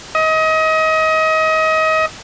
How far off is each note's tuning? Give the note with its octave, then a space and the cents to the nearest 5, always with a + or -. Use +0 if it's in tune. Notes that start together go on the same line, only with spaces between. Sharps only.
D#5 +30